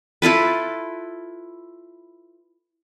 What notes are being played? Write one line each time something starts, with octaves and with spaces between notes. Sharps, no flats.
E4 F4 A4 B4